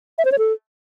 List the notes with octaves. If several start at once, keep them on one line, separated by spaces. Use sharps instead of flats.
E5
C5
C#5
A4